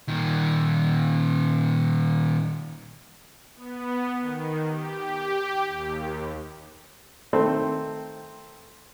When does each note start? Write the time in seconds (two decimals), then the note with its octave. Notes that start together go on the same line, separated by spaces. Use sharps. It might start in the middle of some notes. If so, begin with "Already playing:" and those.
0.08 A#2 D#3
3.56 B3
4.20 D#3
4.67 G4
5.67 D#2
7.33 D#3 A3 C4